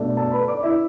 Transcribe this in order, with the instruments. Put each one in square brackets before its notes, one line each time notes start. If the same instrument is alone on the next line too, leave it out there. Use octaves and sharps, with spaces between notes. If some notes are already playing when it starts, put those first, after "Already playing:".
Already playing: [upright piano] B2 A3 D4
A4 A5
B4 B5
D5 D6
E4 E5